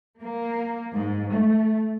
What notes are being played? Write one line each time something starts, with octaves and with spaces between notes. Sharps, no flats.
A#3
G#2
A3